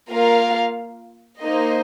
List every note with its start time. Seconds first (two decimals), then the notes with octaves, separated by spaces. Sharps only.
0.10 A#3 F4 A#4 F5
1.42 A#3 D#4 C5 D#5